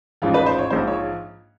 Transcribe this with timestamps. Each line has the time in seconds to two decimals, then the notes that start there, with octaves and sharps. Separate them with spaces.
0.22 A1 G#2 F3 F4
0.34 B4
0.46 C5
0.58 C#5
0.70 A#1 G#2 F3 C5
0.87 C#5